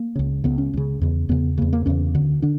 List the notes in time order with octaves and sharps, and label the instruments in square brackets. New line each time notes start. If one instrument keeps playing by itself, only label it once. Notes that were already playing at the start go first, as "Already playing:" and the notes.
Already playing: [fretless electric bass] A#3
C#2 C#3
C#2 C#3 B3
C#4
C#2 C#3
E2 C#3
E2 C#3 B3
E2 C#3 A#3
A#3
E2 C#3 C#4
D2 D3
D3 D4